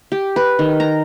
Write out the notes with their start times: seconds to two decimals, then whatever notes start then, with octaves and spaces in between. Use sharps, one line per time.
0.12 G4
0.36 B4
0.59 D#3
0.80 A#5